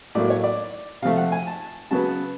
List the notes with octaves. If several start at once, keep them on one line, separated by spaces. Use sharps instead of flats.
A2 F#3 A#3 D5
C#5
D5
C3 F3 A3 F5
F#5
G#5
A5
C#3 F#3 B3 A5